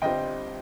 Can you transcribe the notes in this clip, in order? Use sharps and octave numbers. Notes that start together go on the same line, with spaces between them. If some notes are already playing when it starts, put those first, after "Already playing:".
G1 G2 G3 C4 D#5 G5